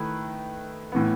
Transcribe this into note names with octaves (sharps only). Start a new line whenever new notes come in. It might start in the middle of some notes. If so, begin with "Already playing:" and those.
Already playing: D#3 A3 E4 B4
A2 E3 B3